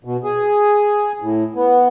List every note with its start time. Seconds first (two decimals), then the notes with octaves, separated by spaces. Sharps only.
0.04 B2
0.24 G#4
1.21 A2
1.55 B3